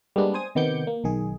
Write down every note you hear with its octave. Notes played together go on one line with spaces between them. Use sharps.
G3 G#3 A#3 B3 D4
C5 G#5 D#6
C3 D#3 B3 D6 G6 C#7
A#3
B1 D#3 G#4